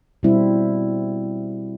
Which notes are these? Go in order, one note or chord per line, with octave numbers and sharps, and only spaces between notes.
B2 G3 C4 E4